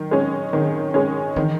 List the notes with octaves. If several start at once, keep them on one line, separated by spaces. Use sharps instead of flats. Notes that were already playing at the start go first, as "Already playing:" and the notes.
Already playing: D#3 F#3
G#3 C#4
D#3
G#3 C#4
D#3 E3